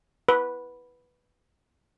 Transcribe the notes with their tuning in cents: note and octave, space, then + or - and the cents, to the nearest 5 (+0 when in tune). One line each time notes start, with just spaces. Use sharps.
B4 -5